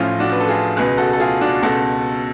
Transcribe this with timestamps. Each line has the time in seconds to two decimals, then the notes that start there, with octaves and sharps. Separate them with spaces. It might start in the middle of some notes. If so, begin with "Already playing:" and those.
Already playing: A1 A2 F3 C#4 F4
0.20 D4 F#4
0.32 B4
0.40 A4
0.48 F4 G#4
0.76 C#2 B2 G#4 B4
0.98 F#4 A4
1.13 A4
1.20 F4 G#4
1.41 D4 F#4
1.63 C#2 B2 F#4 A4